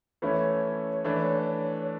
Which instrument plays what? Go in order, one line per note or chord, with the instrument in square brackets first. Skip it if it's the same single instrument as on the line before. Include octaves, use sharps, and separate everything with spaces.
[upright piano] E3 A3 C#4 E4 [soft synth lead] C#5
[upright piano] E3 A3 D4
[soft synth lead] C#5